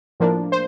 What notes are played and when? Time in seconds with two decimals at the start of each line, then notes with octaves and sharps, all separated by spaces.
0.20 A2 F3 A#3 D4
0.52 C5